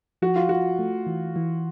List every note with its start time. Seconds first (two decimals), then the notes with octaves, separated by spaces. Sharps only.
0.22 F3 F#4
0.36 F4
0.49 F3 F#4
0.79 A3
1.07 E3
1.36 E3